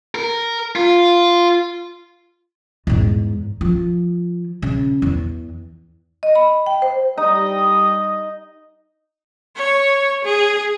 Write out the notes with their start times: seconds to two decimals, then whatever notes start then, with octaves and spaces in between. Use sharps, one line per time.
0.15 A#4
0.76 F4
2.87 E2 G#2
3.61 F3
4.62 C#3
5.02 E2
6.23 D#5
6.35 B5
6.66 G5
6.82 C5
7.17 G3 D#4 D#5 D#6
9.56 C#5
10.24 G#4